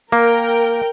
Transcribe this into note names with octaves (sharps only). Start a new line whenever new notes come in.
A#3 A#4 G5